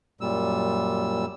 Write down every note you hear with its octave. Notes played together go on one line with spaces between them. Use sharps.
F#2 A#2 G3 E6